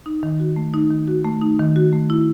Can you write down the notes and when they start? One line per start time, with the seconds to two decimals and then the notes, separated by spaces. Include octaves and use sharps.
0.06 D#4
0.23 D#3
0.40 F#4
0.56 A3
0.74 D#4
0.91 D#3
1.07 F#4
1.25 A3
1.42 D#4
1.59 D#3
1.76 F#4
1.93 A3
2.10 E4